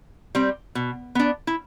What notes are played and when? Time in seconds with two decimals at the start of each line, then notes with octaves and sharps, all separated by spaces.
0.35 G3 C4
0.75 B2
1.15 B3 D4
1.47 E4